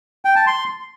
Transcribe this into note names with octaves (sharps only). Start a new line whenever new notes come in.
G5
A5
C6